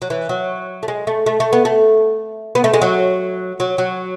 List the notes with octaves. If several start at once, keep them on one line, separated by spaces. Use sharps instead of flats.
F#3
E3
F#3
A3
G#3
A3
A3
A3
B3
A3
B3
A3
G#3
F#3
F#3
F#3